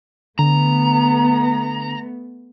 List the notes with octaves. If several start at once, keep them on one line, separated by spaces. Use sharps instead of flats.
D3 A3 B3 A#5